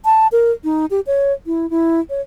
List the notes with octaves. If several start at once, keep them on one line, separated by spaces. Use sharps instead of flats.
A5
A#4
D#4
G4
C#5
E4
E4
C#5